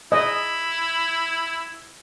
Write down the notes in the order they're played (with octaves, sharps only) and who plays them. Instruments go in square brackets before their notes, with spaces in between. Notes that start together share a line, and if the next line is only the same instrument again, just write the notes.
[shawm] E4 [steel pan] D#5